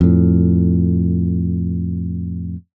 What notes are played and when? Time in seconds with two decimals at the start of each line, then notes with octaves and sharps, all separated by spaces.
0.01 F2 A2